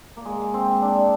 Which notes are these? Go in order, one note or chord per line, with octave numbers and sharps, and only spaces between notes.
A#3
G#3
C4
D4